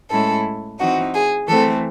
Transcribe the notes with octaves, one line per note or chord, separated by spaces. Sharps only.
A2 G#3 C#4 E4 A4
E3 C4 D#4 F#4
G#4
E3 A3 C4 A4